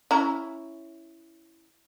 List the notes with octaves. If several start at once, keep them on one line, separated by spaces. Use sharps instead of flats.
C#4 E4 A#5